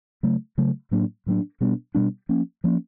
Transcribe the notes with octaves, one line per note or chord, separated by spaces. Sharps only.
C#3 F#3 A3
C#3 F#3 A3
A2 F#3 A#3 D4
A2 F#3 A#3 D4
B2 G3 B3 D4
B2 G3 B3 D4
F3 A#3 C#4
F3 A#3 C#4